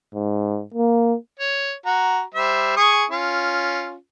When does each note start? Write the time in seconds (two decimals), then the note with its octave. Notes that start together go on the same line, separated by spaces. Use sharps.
0.14 G#2
0.74 A#3
1.40 C#5
1.86 F#4 A#5
2.35 G3 C5 E5
2.77 G#4 C#6 D#6
3.10 C#4 F4